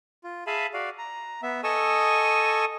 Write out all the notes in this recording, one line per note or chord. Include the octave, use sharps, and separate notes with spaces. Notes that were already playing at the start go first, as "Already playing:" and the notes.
F4
G#4 E5 F5 G#5 A5 B5
F#4 D5 F5
A#5
B3 E5
A4 D#5 G#5 C#6 D#6 E6